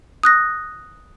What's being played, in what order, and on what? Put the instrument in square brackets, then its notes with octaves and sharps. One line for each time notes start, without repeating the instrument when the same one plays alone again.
[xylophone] D#6 F#6 A#6